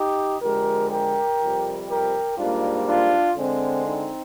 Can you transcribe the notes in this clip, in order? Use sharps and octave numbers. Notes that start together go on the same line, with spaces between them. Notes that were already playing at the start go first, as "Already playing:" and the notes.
Already playing: D#4 G4
F2 D3 G#3 G4 A#4
G4 A#4
F2 C3 G3
G4 A#4
G#2 G3 A#3 D4 F4
D4 F4
D3 G#3 C4
C4 D#4